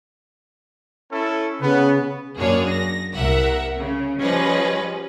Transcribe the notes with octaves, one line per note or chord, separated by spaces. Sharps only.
C#4 E4 A4
C#3 B3
F#2 A#3 D4 G#4 C#5
A#6
C2 A#4 E5 F#5
C#3
F3 G3 C#4 G#4 B4 D#5